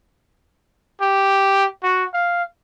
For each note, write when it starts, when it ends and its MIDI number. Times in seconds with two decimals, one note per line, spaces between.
1.01 1.66 67
1.83 2.05 66
2.14 2.43 77